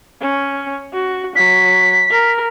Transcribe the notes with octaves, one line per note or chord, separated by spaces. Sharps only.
C#4
F#4
F#3 B6
A#4